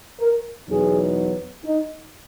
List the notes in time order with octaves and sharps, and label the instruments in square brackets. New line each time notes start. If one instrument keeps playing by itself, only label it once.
[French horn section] A#4
E2 B2 F#3 B3 D#4 G#4
D#4